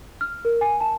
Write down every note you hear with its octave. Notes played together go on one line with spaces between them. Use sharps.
F6
A#4
G#5
A5